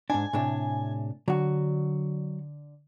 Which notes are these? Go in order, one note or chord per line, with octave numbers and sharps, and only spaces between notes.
G#2 D4 G#5
A2 C3 D4
D3 F#3 F#4